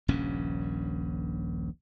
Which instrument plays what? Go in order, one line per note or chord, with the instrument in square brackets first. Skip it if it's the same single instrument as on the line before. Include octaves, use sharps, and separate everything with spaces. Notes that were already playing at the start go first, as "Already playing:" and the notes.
[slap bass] D#1 A#1 G2 C#4